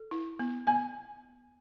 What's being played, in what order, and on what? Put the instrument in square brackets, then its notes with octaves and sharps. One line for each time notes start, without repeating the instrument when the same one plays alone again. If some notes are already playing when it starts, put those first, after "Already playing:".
Already playing: [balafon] A4
E4
B3
[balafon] B3 [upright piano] G#5